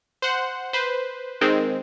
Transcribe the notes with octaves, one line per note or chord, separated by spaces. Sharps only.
C5 F#5
B4 C5
D#3 G#3 C4